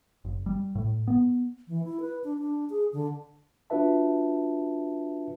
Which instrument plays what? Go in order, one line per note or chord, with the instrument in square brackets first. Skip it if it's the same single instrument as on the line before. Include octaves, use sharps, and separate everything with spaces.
[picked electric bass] F#1
G3
A2
B3
[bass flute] E3
E4
B4
D4
D4
G#4
D3
[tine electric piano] D4 F4 F#4 B4 E5 A5